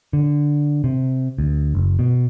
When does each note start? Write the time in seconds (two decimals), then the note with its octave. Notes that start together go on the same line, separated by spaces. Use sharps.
0.13 D3
0.84 C3
1.38 D2
1.75 F#1
1.99 B2